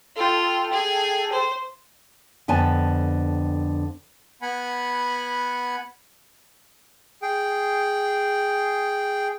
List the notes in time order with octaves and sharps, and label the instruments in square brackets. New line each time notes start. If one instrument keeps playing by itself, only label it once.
[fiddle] F4 [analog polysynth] A4 G5
[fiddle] G#4
C5
[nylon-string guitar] F2 D3 B3 G#5 A5
[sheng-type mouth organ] B3 F#5 G#5 B5
G#4 G5